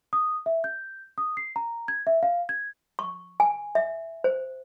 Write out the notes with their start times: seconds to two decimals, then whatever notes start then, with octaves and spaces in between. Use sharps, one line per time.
0.13 D#6
0.46 E5
0.64 G6
1.18 D#6
1.37 C7
1.56 A#5
1.88 G#6
2.07 E5
2.23 F5
2.49 G#6
2.99 C#6
3.40 G#5
3.75 E5
4.24 C5